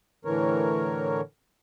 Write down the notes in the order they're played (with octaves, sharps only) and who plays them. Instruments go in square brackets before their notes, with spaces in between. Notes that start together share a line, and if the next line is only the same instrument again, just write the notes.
[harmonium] A2 D3 E3 A#4 C#5